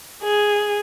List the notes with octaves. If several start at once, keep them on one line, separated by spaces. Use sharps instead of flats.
G#4